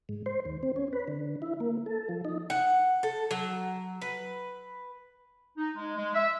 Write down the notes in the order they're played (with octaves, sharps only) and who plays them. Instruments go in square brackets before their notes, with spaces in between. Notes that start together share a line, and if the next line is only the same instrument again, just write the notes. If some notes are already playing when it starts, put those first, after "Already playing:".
[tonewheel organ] G#2
C5
D#2
C4
C#4
B4
D3
E4
A#3
A4
F3
D#4
[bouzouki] F#5
A4
F#3
B4
[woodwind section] D#4
G#3
G#3
E5